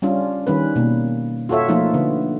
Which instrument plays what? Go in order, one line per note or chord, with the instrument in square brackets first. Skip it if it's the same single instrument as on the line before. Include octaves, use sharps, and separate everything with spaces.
[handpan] G3 C#4 D4 F4
D#3 G3 C#4 B4
B2 A#3
F4 F#4 A4 C#5 E5
F3 A3 A#3 D#4 F4
D3 B3